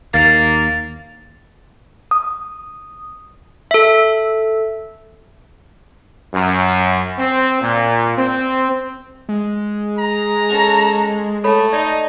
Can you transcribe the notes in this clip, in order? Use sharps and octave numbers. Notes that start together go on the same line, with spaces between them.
D#2 A#3 A6
D#6
A4 E5
F#2
C4
A#2
C4
G#3
A#5
C#4 A4
A3 A4 C#5 B5
D#4 D5 D#5